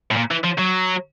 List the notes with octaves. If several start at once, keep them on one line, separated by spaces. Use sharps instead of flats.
A2
A#2
E3
F3
F#3